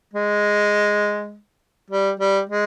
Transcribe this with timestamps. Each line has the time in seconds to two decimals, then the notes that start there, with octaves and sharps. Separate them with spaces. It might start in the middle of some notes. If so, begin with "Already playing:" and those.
0.14 G#3
1.91 G3
2.20 G3
2.50 G#3